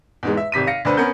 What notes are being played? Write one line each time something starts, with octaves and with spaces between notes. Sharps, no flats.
E2 G#2 G#3
E5
G#1 C3 B6 D#7
F5 A#6 C#7
D2 D4 B4 C5
B3 C#4 A#4 G6